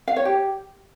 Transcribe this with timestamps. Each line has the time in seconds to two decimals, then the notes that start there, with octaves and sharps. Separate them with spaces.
0.08 F5
0.16 C#5
0.25 G4